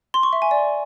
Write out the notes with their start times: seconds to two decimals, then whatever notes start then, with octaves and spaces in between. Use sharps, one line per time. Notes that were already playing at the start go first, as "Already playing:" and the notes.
0.14 C6
0.23 C#6
0.33 E5
0.42 G#5
0.51 D5